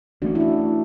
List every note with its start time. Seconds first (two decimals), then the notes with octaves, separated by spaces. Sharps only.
0.22 E3 A3 C#4 D4 F#4
0.35 E4
0.40 D4 F#4